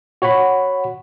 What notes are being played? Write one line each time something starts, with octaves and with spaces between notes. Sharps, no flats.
F#4 C#5 F#5 B5